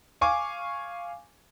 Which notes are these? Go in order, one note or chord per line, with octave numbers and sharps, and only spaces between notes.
F5 G#5 C#6 D6